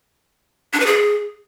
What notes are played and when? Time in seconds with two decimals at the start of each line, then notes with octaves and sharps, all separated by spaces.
0.73 D4
0.80 B4
0.86 G#4